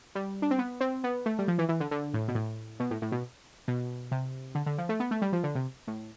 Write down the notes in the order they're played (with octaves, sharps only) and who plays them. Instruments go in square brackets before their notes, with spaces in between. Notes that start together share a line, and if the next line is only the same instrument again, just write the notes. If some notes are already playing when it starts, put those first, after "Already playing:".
[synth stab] G3
D4
C4
B3
C4
B3
A3
G3
F3
E3
E3
D3
D3
A2
B2
A2
B2
A2
A2
B2
B2
C3
D3
D3
F3
A3
B3
A3
G3
F3
D3
C3
A2